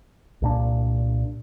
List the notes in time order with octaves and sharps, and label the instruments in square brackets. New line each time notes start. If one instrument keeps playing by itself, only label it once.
[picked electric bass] C2 A#2 D4